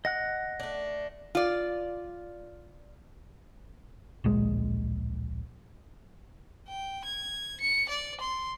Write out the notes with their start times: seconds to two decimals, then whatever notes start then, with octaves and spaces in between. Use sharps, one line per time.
0.05 D#5 F#5 F#6 A#6
0.60 A3 D4
1.35 F4 D5
4.24 D1 A#1 G#3
6.68 G5
7.04 G#6
7.60 C#7
7.89 D5
8.21 C6